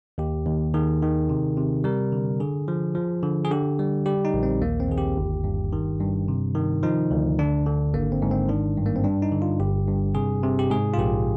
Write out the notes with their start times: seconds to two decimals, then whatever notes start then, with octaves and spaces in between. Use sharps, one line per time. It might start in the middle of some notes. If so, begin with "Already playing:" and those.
0.18 D#2 G4
0.47 D#2
0.74 D#3 G#4
1.02 D#3
1.30 C3
1.57 C3
1.84 G3 A#4
2.12 D3
2.40 D3 G#4
2.68 F3
2.95 F3
3.23 D3
3.45 G#4
3.50 D3 G4
3.79 G3
4.06 G3 G4
4.25 D#4
4.34 A#1
4.43 C4
4.62 D#2 A#3
4.80 C4
4.89 D#2 G#4
4.98 G4
5.17 G1
5.44 G2
5.73 D#3
6.00 G2
6.28 C3
6.55 D#3
6.83 F3 D#4
7.11 D2
7.39 D3 D4
7.66 D3
7.93 G#1 A#3
8.12 C4
8.22 G#2
8.31 C4
8.49 D#3 D4
8.77 G2
8.86 A#3
8.96 C4
9.04 G2 D4
9.22 D#4
9.32 D3
9.42 F4
9.60 G1 G4
9.88 G2
10.15 C3 G#4
10.43 C3
10.59 G4
10.70 G#2 G#4
10.94 F4
10.98 A#1 G4